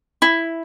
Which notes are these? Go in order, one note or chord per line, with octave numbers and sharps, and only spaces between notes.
E4